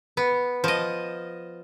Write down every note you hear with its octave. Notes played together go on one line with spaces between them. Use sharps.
B3
F3 D#5